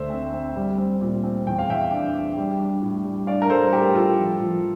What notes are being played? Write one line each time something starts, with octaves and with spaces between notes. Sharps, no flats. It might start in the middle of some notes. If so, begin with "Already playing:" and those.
Already playing: D2 D3 C5 E5
C4
C4
G3
C4
A#2
C4
E2 G5
F5
E2 E5 G5
D4
D4
G3
D4
A2
G3
D4 D5 F5
A#4
G3 A4 C5
A2 G4 A#4
G3 F4 A4
F3
F3